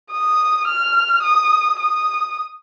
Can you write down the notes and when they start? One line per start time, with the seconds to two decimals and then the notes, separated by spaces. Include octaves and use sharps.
0.12 D#6
0.68 F6
1.23 D#6
1.79 D#6